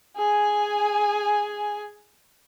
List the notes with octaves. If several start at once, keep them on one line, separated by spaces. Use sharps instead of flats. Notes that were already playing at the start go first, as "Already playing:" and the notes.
G#4 G#5